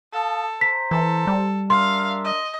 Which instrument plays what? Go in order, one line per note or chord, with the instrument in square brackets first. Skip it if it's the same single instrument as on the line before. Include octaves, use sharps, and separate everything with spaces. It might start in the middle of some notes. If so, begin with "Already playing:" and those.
[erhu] A4 [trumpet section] F5 A5 D#6
[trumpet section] C5 A#5 [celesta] B6
[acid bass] E3 [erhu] A4
[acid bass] G3
[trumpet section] D4 A#4 E5 [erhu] F5 [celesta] C6
[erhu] D#5